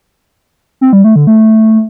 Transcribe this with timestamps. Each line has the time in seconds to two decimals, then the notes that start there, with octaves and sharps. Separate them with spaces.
0.81 C4
0.93 G3
1.04 A3
1.16 D3
1.27 A3